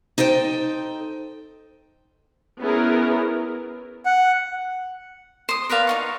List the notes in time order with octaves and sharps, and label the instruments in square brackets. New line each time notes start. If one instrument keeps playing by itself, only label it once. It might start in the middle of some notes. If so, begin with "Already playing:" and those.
[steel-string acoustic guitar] D#4 A4 C5 G5
[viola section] B3 C#4 E4 G#4 A#4
[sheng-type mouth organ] F#5
[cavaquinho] C5 D#6
A#4 B4 D5 F5
D#4 F4 C#6